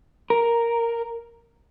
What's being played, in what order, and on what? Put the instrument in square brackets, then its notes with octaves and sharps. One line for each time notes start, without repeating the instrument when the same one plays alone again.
[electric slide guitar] A#4